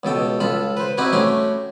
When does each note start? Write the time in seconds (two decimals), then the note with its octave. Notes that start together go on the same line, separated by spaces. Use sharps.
0.03 C#2 B2 A4 G5
0.40 C#2 F4 A4 B5
0.77 B4 C5
0.98 C4 D#4 E4 F#4 G4 B4
1.13 A3 C#4 F#4 G4 C6